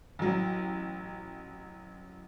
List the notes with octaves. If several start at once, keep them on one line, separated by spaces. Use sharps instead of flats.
A1 F#3